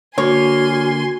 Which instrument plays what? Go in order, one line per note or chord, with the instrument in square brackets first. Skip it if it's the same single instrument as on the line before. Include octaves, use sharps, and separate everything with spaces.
[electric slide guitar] D3 A#3 [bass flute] F#4 [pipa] C#5 [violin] G#5 C6